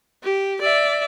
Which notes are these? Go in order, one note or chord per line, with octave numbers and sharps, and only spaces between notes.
G4
D5 E5